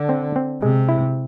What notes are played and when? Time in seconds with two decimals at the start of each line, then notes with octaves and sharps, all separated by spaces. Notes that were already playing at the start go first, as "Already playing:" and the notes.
Already playing: D3
0.09 C4
0.36 C4
0.62 C3 G#3
0.89 E4